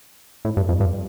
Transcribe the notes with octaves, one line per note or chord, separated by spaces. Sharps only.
A2
G2
F2
G2